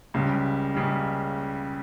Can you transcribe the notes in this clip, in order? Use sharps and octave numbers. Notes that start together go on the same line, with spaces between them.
C#2 C#3 G3
C#2 C#3 G3